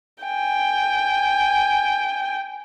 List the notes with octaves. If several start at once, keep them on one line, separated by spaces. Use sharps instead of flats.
G5 G#5